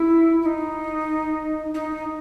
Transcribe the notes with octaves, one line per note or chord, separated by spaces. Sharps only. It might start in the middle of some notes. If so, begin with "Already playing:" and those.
Already playing: E4
E4
D#4
D#4